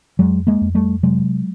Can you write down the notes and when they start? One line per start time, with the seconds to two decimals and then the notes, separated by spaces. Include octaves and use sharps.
0.19 F2 F#3 G#3
0.47 G#3 A#3
0.61 F2
0.75 G3 A3
1.03 C3 F#3 G#3